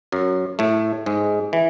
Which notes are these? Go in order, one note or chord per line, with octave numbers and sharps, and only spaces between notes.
F#2 F#3
A2 A3
G#2 G#3
E3